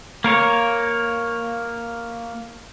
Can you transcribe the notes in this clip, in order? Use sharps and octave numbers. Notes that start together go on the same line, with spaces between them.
A#3 A#4 C#5